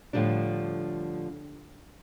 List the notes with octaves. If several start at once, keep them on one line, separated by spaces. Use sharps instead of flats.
A2 D3 F3 G3 D4